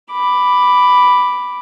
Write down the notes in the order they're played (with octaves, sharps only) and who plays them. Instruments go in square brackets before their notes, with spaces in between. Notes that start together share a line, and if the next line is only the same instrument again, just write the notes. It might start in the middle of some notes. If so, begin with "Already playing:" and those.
[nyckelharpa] B5 D6